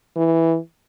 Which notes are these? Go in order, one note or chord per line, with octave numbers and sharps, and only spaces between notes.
E3